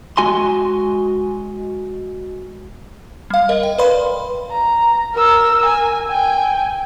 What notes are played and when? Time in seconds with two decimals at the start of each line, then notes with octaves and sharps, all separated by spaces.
0.17 G#3 F#4 G#5 C6
3.30 G3 F5
3.49 A#4 D#5
3.63 G5
3.78 B4 D5 F5 B5 C6
4.52 A#5
5.14 A#4 E6
5.66 G#5
6.09 G5 G#5